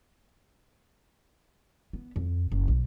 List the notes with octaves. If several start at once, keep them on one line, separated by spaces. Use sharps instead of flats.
B3
F2
F#1
B1